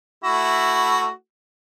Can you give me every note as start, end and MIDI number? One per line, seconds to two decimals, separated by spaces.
0.24 1.10 57
0.24 1.10 64
0.24 1.10 66